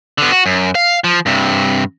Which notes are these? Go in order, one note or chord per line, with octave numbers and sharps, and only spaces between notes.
D3 B3
F#4
F#2
F5
F3
G2 C3